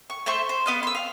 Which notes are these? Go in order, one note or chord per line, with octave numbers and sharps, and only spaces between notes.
C#6
A3 C5 E5 C#6
C5
B3 D#5 F5
C6 E6
F5